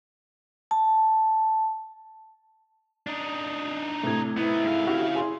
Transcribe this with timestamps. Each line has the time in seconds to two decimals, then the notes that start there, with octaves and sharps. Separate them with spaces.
0.71 A5
3.07 D4 D#4
4.03 A2 C3 A3 G#6
4.37 B3 D#4 E4
4.65 G#2 F5
4.87 C#4 F#4 G4 E5 F5
5.15 G#4 G#5 C6